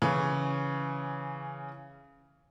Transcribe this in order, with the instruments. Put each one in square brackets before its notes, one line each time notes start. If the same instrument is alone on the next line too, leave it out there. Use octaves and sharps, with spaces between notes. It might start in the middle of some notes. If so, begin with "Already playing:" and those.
[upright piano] C#3 E3 C#4